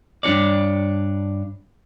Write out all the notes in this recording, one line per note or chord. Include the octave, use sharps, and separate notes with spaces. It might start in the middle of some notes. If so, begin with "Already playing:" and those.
G2 D4 F#4 C#5 D5